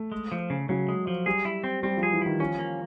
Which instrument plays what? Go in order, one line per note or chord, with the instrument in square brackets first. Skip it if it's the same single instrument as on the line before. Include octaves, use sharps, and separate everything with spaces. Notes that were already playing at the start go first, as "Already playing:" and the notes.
Already playing: [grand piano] A3
[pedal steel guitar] G#3
F3
C#3
[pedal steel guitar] C#3 [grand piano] F#3
[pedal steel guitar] G#3
F3
[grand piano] G3 [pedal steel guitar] G#4
[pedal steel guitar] E4
C4
[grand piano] G3 [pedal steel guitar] C4
[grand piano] F3
[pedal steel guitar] G#4
[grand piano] E3
[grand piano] D#3 [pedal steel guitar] E4
[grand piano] F3 [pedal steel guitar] C#4
[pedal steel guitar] A#3